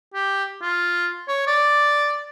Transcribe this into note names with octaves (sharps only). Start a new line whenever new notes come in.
G4
F4
C#5
D5